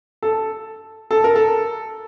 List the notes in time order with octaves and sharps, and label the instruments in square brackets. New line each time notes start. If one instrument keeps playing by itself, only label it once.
[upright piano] A4
A4
A#4
A4